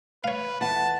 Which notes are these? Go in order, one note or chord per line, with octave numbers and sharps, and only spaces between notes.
B4 C#5 F5
E2 B4 F#5 A5